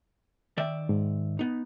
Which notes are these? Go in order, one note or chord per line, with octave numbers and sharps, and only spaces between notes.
D#3 D5 E5
G#2
B3 D#4